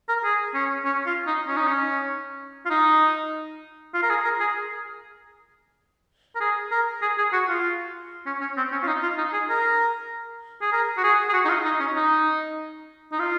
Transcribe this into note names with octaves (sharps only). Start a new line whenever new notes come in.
A#4
G#4
C#4
C#4
F4
D#4
C#4
D#4
C#4
F4
D#4
F4
A#4
G#4
A#4
G#4
A#4
G#4
A#4
G#4
G#4
F#4
F4
C#4
C#4
C4
C#4
F4
D#4
F4
D#4
G#4
A#4
G#4
A#4
F#4
G#4
G#4
F#4
D#4
F4
D#4
C#4
D#4
D#4
F4